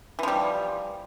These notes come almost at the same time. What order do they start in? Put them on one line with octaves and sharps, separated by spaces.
E3 F3 G3